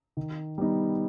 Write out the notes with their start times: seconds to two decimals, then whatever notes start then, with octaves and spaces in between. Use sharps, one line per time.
0.17 D#3
0.58 G3 B3 D#4